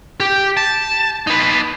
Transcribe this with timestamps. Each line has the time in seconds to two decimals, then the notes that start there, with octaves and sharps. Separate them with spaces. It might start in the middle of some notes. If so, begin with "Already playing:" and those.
0.20 G4
0.57 A5
1.27 D#4 B4